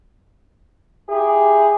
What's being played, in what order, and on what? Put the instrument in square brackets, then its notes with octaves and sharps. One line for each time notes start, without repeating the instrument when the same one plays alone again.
[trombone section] E4 G4 G#4